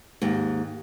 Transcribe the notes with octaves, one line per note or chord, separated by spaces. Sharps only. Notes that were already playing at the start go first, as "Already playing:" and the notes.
D#2 G#2